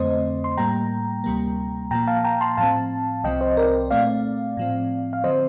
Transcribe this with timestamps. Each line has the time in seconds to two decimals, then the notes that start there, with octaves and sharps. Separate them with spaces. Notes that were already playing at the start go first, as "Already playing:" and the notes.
Already playing: F2 D3 A3 C4 C5 D#5
0.44 C6
0.57 A2 G3 A#3 G5 A#5
1.24 D2 C3 G3 A#3
1.91 A#2 F3 A#3 G5 A#5
2.07 F5 A5
2.24 G5 A#5
2.41 A5 C6
2.57 A2 F3 C4 F5 A5
3.24 C2 C3 F3 C4 D#5 G5
3.41 C5 D#5
3.57 A#4 D5
3.91 A#2 A3 C4 D5 F5
4.57 A2 F3 C4
5.13 F5
5.24 D3 F3 C4 C5 D#5